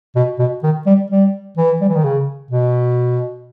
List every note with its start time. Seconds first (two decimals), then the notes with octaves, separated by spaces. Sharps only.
0.16 B2
0.39 B2
0.63 D#3
0.86 G3
1.10 G3
1.57 E3
1.81 G3
1.89 E3
1.96 D#3
2.04 C#3
2.50 B2